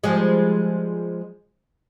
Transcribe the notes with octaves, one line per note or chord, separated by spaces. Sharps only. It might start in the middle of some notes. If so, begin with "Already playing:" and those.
F3 G3 G#3